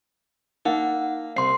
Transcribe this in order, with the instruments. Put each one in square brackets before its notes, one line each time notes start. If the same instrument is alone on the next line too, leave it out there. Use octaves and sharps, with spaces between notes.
[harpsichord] A#3 [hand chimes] D#4 F#5
[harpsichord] C2 [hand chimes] C6 C7